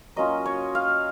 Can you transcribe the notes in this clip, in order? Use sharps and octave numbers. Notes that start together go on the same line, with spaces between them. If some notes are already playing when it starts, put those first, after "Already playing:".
F#3 A#3 C#4 F4 D#5
C#5
F5